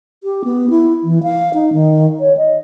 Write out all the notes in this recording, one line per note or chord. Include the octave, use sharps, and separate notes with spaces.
G4
B3
E4
E3
F5
D#4
D#3
C#5
D#5